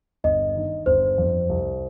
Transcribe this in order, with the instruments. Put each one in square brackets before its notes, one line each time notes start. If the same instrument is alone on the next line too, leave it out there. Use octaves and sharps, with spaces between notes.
[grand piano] G1 [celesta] D#5
[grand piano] D#3
[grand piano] G1 [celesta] C5
[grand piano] F2
C2